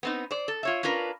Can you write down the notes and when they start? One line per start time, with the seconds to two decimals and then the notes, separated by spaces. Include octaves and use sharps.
0.03 B3 C4 D#4
0.31 C5 D5
0.48 A4
0.63 F4 C#5 E5
0.83 C#4 D4 F4 A#4 B4